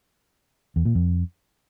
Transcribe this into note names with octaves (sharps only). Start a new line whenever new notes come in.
E2
A#2
F2